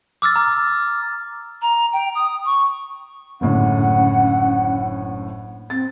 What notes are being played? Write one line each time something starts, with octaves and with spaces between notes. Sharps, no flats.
D6 E6 F6 A6
A#5 F6
A#5
G5
D#6
C#6
F#1 A2 D3 C#4 F#5
C4 A6